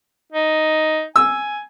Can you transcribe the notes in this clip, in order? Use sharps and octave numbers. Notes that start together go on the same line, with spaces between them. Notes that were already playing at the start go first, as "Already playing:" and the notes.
D#4
G#5 E6